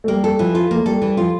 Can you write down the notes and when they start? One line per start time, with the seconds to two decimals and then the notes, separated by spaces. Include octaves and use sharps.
0.04 A3
0.08 G3 A#3
0.24 A4
0.39 E3 F3
0.55 F4
0.71 A3 A#3
0.86 G3 A4
1.02 E3 G3
1.17 F3 F4